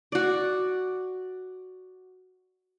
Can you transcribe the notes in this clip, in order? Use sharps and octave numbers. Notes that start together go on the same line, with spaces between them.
F#4 D5